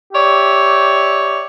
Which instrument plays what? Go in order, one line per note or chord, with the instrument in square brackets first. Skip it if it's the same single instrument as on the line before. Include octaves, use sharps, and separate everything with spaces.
[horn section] G4 C#5 D5 E5